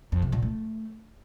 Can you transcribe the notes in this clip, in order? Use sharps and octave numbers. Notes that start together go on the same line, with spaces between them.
F2
C3
A#2
A3